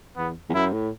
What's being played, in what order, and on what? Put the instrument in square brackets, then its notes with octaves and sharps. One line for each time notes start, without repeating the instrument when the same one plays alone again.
[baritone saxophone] E2 [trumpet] B3
[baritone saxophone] E2
[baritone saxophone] F#2 [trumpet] E4
[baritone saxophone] A2